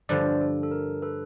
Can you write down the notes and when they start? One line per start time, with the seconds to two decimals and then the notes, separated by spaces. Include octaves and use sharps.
0.09 G2 D3 F3 C5 D5
0.41 A4
0.63 A4
0.71 A#4
1.02 A4 B4